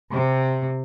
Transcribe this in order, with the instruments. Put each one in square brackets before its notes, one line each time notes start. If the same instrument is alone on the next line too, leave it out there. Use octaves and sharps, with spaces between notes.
[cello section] C3